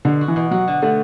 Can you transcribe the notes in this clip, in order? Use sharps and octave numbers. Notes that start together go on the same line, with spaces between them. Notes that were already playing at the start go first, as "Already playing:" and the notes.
B2 D3
F#4
E3
B2
F#3 F#4
D3
D3 A3